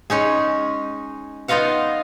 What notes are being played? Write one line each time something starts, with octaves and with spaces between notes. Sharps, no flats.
G#3 C#4 D#4 G#4
B3 D#4 F4 D#5 F5 F#5